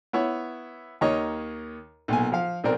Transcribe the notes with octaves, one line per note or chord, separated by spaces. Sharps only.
B3 E4 C#5
D#2 D#3 D#4 C#5 D#5
B1 A#2 G#5
F3 F5
B1 C4 D4 A#4